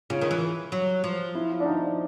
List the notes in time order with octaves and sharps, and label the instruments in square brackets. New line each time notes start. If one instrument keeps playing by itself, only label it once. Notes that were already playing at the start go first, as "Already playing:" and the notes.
[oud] C#3 [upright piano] F4
[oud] D#3
E3
F#3
F3
[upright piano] E4
D4
D#4